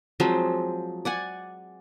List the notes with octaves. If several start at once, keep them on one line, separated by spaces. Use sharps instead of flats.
F3 F#3 G#3 C4
D5 F#5 G#5